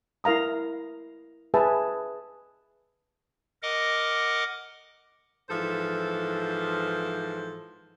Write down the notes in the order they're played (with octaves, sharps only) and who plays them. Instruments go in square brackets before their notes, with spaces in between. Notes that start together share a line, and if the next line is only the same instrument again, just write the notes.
[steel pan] E4 A#4 F5 A#5 D#6
G#4 B4 E5 G#5 A5
[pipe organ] A#4 D#5 F#5 D6
[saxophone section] G#2 E3 F3 A4 C5